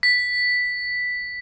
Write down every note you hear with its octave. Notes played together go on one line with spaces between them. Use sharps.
B6